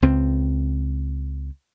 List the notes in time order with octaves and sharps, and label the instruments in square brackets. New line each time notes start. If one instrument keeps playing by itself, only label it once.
[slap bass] C#2 C4